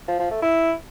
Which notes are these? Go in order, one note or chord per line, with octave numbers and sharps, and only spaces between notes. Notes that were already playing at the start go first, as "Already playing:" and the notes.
F3
F3
A3
E4